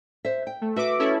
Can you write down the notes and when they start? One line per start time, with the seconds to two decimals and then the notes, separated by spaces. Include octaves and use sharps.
0.25 C5 E5
0.47 G5
0.61 A3
0.76 F#4 B4 E5 D6
0.99 C#4 E4 A4